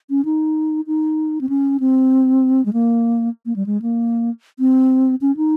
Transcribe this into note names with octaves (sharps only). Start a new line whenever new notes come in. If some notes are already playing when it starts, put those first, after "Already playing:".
C#4
D#4
D#4
C4
C#4
C4
G#3
A#3
A#3
G3
G#3
A#3
C4
C#4
D#4